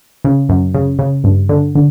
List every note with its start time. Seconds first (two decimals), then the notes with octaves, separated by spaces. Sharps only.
0.25 C#3
0.49 F#2
0.75 C#3
0.99 C#3
1.24 G2
1.49 D3
1.75 D3